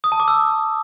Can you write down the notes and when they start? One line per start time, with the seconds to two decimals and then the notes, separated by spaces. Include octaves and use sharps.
0.04 D#6
0.12 A5
0.20 D6
0.28 E6